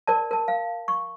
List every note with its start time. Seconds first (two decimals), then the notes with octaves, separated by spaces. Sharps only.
0.07 A#4 D5 A5
0.31 A#4 A5
0.48 F5
0.88 C#6